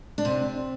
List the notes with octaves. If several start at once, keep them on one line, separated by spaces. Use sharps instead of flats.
D4
C3 C4